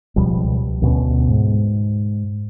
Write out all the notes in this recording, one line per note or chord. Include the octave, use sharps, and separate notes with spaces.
C#2 B2 F3 G3
D2 B2 C#4
G#2